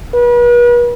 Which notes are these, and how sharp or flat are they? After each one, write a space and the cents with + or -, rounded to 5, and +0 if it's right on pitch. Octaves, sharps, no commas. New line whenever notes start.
B4 -40